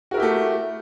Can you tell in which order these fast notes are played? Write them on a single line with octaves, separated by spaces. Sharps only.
F#4 A#4 E4 G4 A3